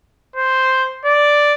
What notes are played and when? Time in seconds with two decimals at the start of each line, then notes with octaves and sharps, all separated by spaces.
0.36 C5
1.05 D5